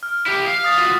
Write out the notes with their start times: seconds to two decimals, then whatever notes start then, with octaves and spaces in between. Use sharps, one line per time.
0.03 F6
0.26 E4 G4 B6
0.47 F5
0.64 D#6 A6 F7
0.78 F4 F#4